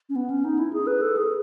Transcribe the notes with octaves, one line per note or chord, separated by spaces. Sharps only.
C#4
B3
C#4
D#4
E4
G#4
B4
A4
G#4